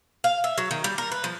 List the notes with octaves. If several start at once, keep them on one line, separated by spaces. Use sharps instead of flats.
F5
E5
F#3
D#3
G3
A#4
B4
F3